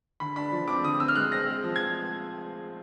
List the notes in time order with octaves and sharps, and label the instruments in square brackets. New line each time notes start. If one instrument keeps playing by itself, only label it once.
[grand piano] D3 [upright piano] B5
[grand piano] D4 [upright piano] B5
[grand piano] F3
[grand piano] C4 [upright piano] D6
[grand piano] D3 [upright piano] D#6
[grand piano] C4 [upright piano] E6
[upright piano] F6
[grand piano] G#3 [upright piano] F#6
[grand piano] C4 [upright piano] A#6
[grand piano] G#3
F3
[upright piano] G#6